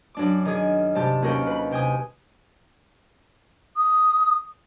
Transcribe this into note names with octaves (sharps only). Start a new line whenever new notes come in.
F#2 D4 D6
D#3 G#4
G2 C3 G4 A5
D#2 C#4 F#4 A#4 B4 G5
B4 B5
C3 G5 G#5 D#6
D#6